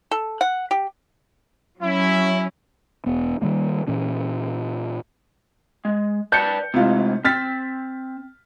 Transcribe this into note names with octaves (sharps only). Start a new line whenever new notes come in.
A4
F#5
G4
F#3 C#4 E4
E1 B3
D#3 G3 A#3
A#2 E3 C#4
G#3
B4 D5 A5 G6 C#7
A2 C3 G#3 E4 F4
C4 F6 A6 B6